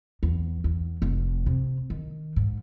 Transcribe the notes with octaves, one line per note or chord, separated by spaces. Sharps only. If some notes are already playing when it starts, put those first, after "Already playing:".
E2
E2
F1
C3
D#3
G#2